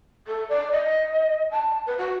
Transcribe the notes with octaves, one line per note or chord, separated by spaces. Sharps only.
A4
D5
D#5
A5
B4
F#4